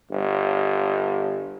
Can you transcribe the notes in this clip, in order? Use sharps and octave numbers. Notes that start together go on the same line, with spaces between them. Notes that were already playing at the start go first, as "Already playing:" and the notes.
G1